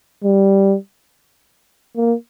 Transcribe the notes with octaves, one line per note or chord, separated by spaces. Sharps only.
G3
A#3